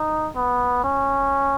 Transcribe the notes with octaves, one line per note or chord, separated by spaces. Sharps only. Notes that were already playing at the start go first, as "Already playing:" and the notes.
Already playing: D#4
B3
C#4